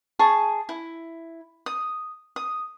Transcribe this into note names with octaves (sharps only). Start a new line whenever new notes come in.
G#4 A5 C#6
E4
D#6
D#6